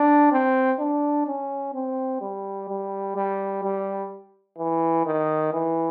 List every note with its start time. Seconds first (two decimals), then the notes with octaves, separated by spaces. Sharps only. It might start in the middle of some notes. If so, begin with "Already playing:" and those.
Already playing: D4
0.32 C4
0.80 D4
1.27 C#4
1.75 C4
2.21 G3
2.69 G3
3.16 G3
3.63 G3
4.58 E3
5.06 D#3
5.53 E3